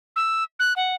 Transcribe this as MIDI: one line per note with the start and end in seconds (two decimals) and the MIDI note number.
0.16 0.44 88
0.60 0.73 90
0.76 0.95 78